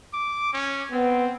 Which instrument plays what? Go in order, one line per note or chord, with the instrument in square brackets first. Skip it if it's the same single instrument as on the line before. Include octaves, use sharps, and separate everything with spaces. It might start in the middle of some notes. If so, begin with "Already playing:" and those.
[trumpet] D6
C#4
[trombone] B3 [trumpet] C4